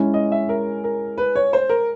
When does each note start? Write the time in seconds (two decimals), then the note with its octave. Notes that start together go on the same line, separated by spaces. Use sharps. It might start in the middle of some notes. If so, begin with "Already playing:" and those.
Already playing: G#3 C#4 E4
0.14 D#5
0.32 E5
0.49 A#4
0.84 A#4
1.18 B4
1.36 C#5
1.53 C5
1.69 A#4